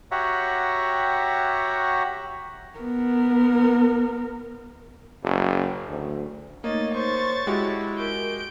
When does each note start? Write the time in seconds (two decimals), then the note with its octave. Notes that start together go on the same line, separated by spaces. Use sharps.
0.11 F#4 G4 C#5 E5 F#5 A#5
2.79 B3 A#4
5.23 F#1
5.88 D2
6.64 A3 A#3 D#4 C#5 D#5 A6
6.95 C5 C#5 C#6 A6
7.47 G#3 E4 F#4 G4
7.99 A#4 G6 D7